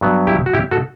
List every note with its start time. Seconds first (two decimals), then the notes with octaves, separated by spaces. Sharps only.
0.01 G2 F#3 B3
0.27 E4 G4
0.46 F#4
0.53 E4 G4
0.71 F#4 A4